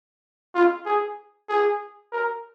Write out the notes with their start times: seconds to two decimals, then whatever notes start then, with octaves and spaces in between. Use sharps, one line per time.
0.55 F4
0.86 G#4
1.49 G#4
2.12 A#4